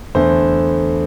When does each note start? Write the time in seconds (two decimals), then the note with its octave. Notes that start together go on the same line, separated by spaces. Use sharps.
0.15 E2 D3 A3 C5